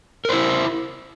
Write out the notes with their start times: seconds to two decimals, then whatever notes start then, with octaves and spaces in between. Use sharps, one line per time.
0.25 A#4
0.29 C5
0.33 E4